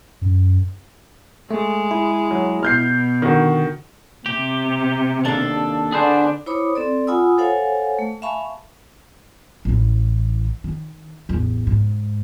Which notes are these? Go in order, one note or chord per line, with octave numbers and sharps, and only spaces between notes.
F#2
G#3 A3
E4
F#3
B2 F6 G6 C7
D3 D#3 F#4
C3 G4
D#2 D4 A4 F5
D3 D4 G#4 B4 C5
E4 C5 C#5 B5 D6 D#6
C4 A4 D5
F4 F#5 G#5 B5 D#6 E6
A4 C5 C#5 F5 F#5 G#5
A3
E5 F5 G#5 A5 B5 C#6
A1 E3
D#3
A1 E2
G#2